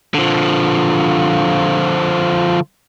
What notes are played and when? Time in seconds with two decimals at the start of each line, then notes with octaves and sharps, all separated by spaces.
0.14 D3 F3